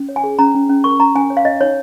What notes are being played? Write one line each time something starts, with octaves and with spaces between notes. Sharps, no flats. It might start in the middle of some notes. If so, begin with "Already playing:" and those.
Already playing: C#4
C#5
G#5
G#4
C#4 A#5
C#4
C#4
A#4 C#6
C#4 A#5
C#4 G#5
C#5
F5
C#5 D#5
D#4 C#5